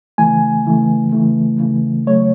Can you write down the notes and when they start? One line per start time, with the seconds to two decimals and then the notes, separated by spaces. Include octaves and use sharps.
0.18 C#3 E3 A3 G#5
0.65 C#3 E3 A3
1.12 C#3 E3 A3
1.60 C#3 E3 A3
2.07 C#3 F#3 A3 C#5